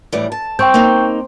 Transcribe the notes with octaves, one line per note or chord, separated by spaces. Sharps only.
A2 E3 G3
A5
C4 G5 C#6 G6
A#3 D#4